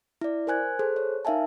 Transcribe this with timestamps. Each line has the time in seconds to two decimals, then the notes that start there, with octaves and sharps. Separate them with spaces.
0.21 E4 D5
0.47 A#4 C5 G#5 F#6 G#6
0.79 G#4 A4 C5 F#6
0.96 C#5
1.25 D#4 A#4 E5 F5 G#5 A5